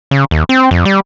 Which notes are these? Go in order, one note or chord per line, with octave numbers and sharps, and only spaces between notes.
C#3
D#2
C4
F2
G3